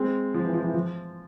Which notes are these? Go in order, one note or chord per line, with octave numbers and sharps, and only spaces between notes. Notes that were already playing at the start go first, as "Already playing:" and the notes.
Already playing: G#3 C4
F3
E3
F3
E3
F3